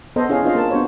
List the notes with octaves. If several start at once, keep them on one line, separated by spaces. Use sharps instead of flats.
B3 A4 C5 D#5 A#5
C#4 E4 G#4 D#5 F5
C4 D4 F4 C5 D#5 F5
A#3 A4 A#4 A5
B3 D4 F#4 C5 C#5